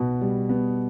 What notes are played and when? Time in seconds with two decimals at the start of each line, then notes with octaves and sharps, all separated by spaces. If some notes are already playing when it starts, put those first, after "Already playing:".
Already playing: B2 B3
0.21 G3
0.49 B3